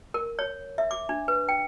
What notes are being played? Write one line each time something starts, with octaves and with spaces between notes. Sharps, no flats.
A#4
C#5
E5
D6
D4
B4
G5